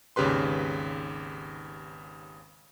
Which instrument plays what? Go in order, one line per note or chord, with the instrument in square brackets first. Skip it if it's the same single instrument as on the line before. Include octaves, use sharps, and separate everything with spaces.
[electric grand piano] G#1 D#2 C#3 G4 B4 C6